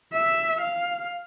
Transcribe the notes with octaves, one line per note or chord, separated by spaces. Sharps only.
E5
F5